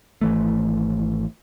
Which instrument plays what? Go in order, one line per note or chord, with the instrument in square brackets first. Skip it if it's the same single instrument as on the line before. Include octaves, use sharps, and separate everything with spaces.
[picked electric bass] G#1 E3 A3